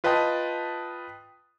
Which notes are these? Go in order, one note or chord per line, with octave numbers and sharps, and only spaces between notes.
F4 B4 D#5 G5 A5 D#6